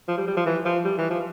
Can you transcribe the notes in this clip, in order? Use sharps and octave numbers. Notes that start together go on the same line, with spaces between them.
F3
G3
G3
F3
E3
F3
G3
E3
F3